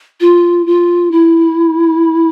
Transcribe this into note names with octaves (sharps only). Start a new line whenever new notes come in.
F4
F4
E4